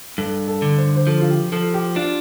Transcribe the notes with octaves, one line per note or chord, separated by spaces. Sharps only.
G2 A4
A4
D3
C5
C5
F3 A4
F4
G4
F3 A4
G4
D4 F4